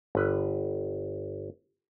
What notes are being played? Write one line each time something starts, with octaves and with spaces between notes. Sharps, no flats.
G1 B4